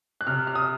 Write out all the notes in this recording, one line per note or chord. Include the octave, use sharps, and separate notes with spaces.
F#6
C3 F6
F6
D#6